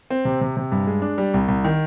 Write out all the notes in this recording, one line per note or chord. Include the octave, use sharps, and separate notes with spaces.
C4
C3
C3
C3
G2
G#3
D4
G3
C2
C2
D#3